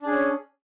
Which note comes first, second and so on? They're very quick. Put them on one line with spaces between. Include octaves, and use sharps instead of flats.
D4 G#4 C#4